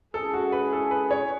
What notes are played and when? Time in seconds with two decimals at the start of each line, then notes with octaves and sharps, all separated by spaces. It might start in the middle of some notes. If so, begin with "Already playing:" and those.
0.14 G#3 C#4 E4 G#4 A4
0.33 F#4
0.52 B4
0.73 A4
0.91 B4
1.11 C#5